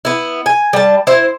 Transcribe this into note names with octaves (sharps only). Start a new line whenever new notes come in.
B3 E4
G#5
G3 A5
E4 C5